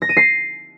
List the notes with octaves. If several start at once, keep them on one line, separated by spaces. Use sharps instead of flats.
A#6
D#7
C7